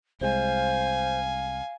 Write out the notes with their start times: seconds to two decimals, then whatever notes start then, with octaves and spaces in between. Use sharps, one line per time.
0.21 C2 G#3 C5 F5 G#5